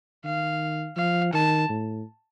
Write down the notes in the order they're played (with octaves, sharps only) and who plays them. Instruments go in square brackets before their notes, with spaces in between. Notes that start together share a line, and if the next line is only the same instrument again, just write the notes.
[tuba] D#3 [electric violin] F5
[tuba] F3 [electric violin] F5
[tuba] D#3 [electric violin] A5
[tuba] A2